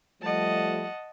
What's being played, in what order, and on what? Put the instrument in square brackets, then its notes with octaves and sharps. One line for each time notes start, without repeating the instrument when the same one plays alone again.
[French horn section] F3 G3 A3 [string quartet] D#5 F#5 A5